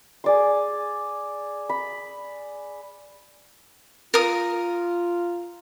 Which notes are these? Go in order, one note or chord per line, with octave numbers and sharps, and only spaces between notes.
G#4 D5 C6
B5
F4 A#4 D#6